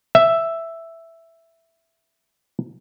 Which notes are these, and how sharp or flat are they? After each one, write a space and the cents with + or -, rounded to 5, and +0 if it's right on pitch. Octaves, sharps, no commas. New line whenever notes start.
E5 +5